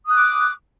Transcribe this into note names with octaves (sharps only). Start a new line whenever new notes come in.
D6 D#6 F#6